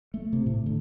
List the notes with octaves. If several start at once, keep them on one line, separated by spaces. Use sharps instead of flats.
A3
C3
A2
D3